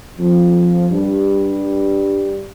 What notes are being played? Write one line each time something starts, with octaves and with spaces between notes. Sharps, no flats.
F2 F3
G2 G3